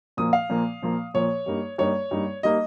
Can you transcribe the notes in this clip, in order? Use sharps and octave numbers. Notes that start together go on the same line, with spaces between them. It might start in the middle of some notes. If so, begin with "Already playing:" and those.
A#2 F3 A#3 D#6
F5
A#2 F3 A#3
A#2 F3 A#3
A#2 F3 A#3 C#5
G2 G3 A#3 D#4
G2 G3 A#3 D#4 C#5
G2 G3 A#3 D#4
G3 A#3 D#4 D#5